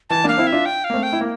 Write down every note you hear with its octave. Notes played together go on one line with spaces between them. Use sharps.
E3 A5
A#3 D4 F5
C4 E4
E5
D4 F4
G5
F5
A#3
A3 C4
G5
E4
A#3